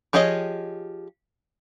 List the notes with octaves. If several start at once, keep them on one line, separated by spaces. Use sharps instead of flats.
F3 G4 G#4 C#5 D#5